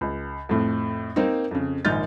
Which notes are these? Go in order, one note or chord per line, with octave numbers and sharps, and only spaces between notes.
C#2
F2 A2
A#3 C4 D#4
F2 C#3
A#1 G#2 D#3 F6 G6 A6